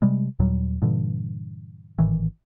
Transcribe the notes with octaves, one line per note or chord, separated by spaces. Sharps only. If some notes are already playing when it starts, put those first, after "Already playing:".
C3 G3 G#3
D#2 A#2 F#3 G3
G2 A#2 D3 E3
G#1 A2 D#3 E3